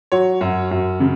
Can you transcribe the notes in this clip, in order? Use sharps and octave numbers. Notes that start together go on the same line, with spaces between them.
F#3 C#5
F#2
F#2
C#3